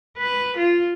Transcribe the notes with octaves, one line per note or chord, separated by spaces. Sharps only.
B4
F4